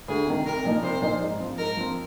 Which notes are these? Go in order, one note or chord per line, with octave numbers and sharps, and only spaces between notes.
D2 G#4
C3 D#3
C2 A#4
A#2 F3 A#3 D#4
C2 C5
A#2 F3 A#3 D#4
G#2
F3 C4
G#2 A#4
F3 C4